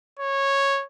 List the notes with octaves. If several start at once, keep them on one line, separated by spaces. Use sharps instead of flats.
C#5